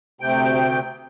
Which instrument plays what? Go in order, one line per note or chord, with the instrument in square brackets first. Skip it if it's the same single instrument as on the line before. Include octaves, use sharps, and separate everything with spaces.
[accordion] D2 C3 G5